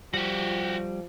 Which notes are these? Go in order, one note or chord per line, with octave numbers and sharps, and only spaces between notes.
F3 G3 F#4 G4